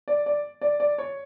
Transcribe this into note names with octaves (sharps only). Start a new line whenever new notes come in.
D5
D5
D5
D5
C#5